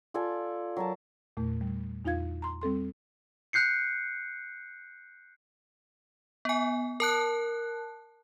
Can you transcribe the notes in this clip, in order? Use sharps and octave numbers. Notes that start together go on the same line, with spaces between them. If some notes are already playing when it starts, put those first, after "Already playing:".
F4 A4 D5 G#5
F#3 A#4 A5
E2 A#2 A3
G3
E2 D#4 F4 F5 G#6
A#5 C6
G3 C4 A4 C6
F#6 G6 C7 C#7
B3 G#5
A#4 A5 F#6